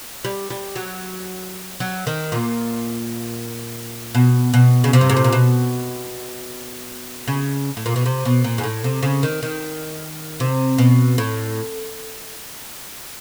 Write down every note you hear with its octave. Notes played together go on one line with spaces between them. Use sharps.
G3
G3
F#3
F#3
D#3
A#2
B2
B2
C#3
C3
G2
G#2
A2
A#2
B2
C#3
A2
A#2
B2
C3
B2
A#2
G#2
A2
C3
C#3
D#3
D#3
C3
B2
A2